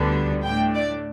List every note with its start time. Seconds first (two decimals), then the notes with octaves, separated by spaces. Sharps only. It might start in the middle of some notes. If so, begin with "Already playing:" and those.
Already playing: D2 D3 G3 B3 D4
0.43 A2 A3 D4 G5
0.74 D5